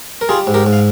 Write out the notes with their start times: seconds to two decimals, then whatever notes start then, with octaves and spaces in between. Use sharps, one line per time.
0.21 A#4
0.29 G3 F4 G#4
0.47 G#2
0.54 G4 A#4
0.66 G#2
0.73 F5